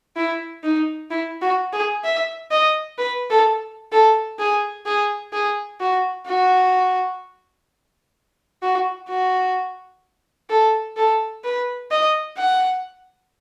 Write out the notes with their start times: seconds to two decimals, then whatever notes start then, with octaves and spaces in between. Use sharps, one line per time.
0.16 E4
0.63 D#4
1.10 E4
1.42 F#4
1.73 G#4
2.04 E5
2.51 D#5
2.98 B4
3.30 A4
3.92 A4
4.39 G#4
4.86 G#4
5.33 G#4
5.80 F#4
6.27 F#4
8.62 F#4
9.09 F#4
10.50 A4
10.97 A4
11.44 B4
11.91 D#5
12.38 F#5